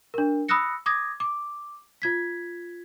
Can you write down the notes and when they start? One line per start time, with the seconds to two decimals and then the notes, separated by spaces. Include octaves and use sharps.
0.14 D4 A#4
0.49 B5 D#6 E6 F#6 A#6 C#7
0.86 D6 D#6 G#6 A#6
1.20 D6
2.02 F4 G#6 B6